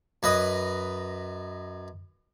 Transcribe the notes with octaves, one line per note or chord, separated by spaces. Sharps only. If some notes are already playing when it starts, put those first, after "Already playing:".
F#2 B4 D#5